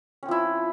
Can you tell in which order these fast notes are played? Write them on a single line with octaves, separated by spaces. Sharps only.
C#4 C4 F3 E4